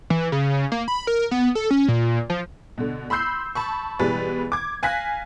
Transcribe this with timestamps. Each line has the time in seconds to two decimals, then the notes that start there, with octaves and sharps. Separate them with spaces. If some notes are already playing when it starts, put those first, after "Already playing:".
0.10 E3
0.32 C#3
0.72 A#3
0.88 B5
1.07 A#4
1.31 B3
1.55 A4
1.71 C#4
1.88 A#2
2.30 F3
2.78 B2 D3
3.10 B5 C6 E6 G6 C7
3.55 A5 B5 C#6
3.99 B2 E3 G3 G#3 B4 A6
4.52 D6 G#6
4.83 F5 G#5 F#6 A#6 B6